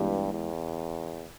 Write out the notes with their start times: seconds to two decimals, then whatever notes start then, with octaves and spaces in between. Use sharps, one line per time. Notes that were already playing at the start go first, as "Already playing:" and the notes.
Already playing: G2 E3 G#3 B3 G4
0.33 E2